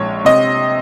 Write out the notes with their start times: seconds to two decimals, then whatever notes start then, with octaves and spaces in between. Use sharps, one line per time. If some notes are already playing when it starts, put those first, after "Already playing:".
Already playing: A#1 G#3 C#5
0.25 C3 D#5